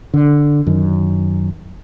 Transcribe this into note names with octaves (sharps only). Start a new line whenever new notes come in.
D3
F#2 D#3